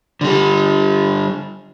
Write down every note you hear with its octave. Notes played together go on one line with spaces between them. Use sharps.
D3 G3